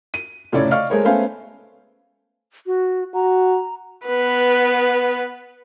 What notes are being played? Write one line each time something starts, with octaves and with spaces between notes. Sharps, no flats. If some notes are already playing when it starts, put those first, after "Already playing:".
D#7
F1 A2 C#3 A3 C#5 D5
D5 D#5 F5 C#6 F6
G#3 A3 G#4 A#4 C5 C#5
A3 B3 C#4 C5 F5 G#5
F#4
F#4 A#5
B3 B4